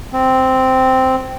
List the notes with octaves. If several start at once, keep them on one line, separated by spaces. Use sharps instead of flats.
C4